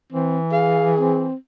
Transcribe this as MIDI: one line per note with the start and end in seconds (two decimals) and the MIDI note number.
0.13 1.29 52
0.13 0.38 60
0.52 1.23 68
0.52 0.91 77
1.00 1.35 60